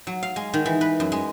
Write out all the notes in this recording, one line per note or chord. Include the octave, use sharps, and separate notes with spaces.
F#3
F5
G#3
D#3
E3
B4
F#2
G#3